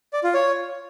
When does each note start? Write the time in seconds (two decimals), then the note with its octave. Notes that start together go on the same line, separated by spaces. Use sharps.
0.13 D5
0.24 F4
0.34 C#5